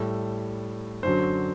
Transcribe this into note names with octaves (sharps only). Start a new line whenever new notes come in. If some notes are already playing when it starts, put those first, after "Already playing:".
Already playing: A2 G3 A4
F#2 D3 F#3 C5